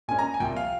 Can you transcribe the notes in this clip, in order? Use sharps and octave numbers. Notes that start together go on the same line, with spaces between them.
A#2 G#3 C#4 G#5
A#5
G#5
C2 A#2 F3 G5
F5